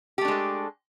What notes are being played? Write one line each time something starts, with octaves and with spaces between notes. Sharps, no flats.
G#3 A3 D4 G4 A4